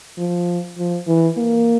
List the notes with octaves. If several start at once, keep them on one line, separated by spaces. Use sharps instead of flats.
F3
F3
E3
A#3